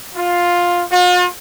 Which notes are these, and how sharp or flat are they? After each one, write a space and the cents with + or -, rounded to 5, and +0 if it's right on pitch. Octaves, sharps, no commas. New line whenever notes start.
F4 +10
F4 +45